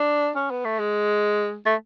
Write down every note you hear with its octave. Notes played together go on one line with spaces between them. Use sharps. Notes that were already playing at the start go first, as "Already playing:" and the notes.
Already playing: D4
C#4
B3
A3
G#3
A3